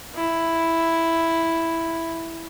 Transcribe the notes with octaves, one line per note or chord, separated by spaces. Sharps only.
E4